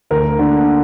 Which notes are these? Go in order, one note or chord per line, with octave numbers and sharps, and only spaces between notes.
D2 A#4
D3 A#3